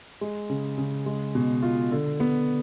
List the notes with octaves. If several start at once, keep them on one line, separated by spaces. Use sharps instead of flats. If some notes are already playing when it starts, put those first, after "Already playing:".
G#3
C#3
C#3
G#3
B2
F4
D3
B3